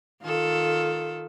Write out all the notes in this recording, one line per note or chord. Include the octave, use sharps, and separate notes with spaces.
D#3 F4 A4